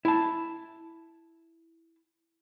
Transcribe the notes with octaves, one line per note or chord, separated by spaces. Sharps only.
E4 A5